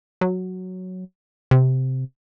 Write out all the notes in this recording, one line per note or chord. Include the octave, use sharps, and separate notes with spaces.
F#3
C3